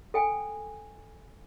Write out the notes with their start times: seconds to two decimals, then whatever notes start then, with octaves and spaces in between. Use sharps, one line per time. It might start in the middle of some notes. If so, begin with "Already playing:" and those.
0.14 A4 G5 G#5